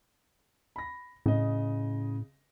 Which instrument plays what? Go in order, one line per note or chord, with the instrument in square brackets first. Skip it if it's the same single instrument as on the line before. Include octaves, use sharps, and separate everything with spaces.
[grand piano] B5 A#6
[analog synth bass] A2 [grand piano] C#3 D#5